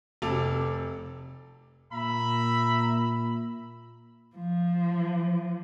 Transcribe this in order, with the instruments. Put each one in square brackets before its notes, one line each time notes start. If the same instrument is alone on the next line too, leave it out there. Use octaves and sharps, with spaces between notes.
[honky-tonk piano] F1 C3 A4 D6 F7
[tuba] A#2 [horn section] E5 A#5 B5
[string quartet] F3